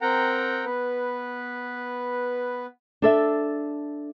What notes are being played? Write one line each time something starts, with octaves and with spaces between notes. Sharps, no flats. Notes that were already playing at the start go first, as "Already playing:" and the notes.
C4 A#4 F#5 G5 A#5
B3 B4
D4 A4 E5